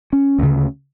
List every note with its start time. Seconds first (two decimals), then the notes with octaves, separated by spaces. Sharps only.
0.13 C#4
0.38 D2 C#3